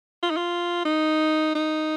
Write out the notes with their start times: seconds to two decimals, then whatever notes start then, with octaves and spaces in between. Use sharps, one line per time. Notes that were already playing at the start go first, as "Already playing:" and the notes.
0.23 F4
0.30 D#4
0.37 F4
0.85 D#4
1.55 D#4